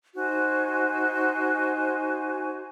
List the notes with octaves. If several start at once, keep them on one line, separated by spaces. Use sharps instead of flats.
D#4 F#4 C5 G#5